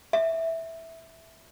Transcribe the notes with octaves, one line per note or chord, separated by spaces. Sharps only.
E5